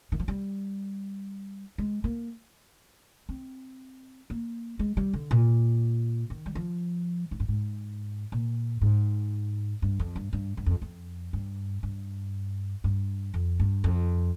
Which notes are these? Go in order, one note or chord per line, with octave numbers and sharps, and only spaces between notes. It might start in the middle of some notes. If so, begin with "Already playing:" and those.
D#3
F3
G3
G#3
A#3
C4
A#3
G#3
G3
D3
A#2
D#3
G3
F3
G#2
G2
G#2
A#2
G#2
G2
F2
G2
G2
G2
F2
F2
G2
G2
G2
F2
G2
F2